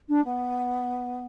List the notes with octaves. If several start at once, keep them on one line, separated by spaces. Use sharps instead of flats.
D4
B3